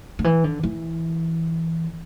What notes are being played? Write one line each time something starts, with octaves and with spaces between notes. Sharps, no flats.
D3
E3
D3
E3